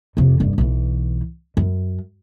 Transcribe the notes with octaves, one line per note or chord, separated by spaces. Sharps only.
F2 C3
F1 G2
B1 E3
F#2